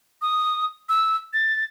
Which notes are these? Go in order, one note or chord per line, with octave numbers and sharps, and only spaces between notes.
D#6
E6
A6